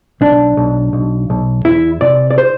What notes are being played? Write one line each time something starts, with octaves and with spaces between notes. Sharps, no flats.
B1 D4
B1
B1
B1
E2 E4
C3 D5
D5
C5